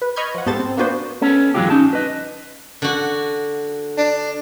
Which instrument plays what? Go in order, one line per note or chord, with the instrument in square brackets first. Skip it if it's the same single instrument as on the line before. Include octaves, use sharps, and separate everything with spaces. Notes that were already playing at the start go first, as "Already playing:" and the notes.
[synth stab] B4
D#5 B5 C#6 F6 G6 G#6
F3 F#5
G#2 B3 G4 A4 C5 A6
C4
A#3 B3 D4 F#4 B4 C5
[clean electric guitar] B3 C#4 A4
G#2 E3 F#3 G#3 F4 G4
C#4 D#4 A5
B4 D#5
[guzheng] D3 F#4
[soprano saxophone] D4